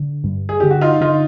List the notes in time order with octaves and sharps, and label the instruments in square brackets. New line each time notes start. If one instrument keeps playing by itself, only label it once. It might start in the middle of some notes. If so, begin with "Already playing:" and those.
Already playing: [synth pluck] D3
G2
[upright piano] G#4
[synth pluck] D3 [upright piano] G4
[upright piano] F#4
D#4 F4
[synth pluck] D3 [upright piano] D#4 F4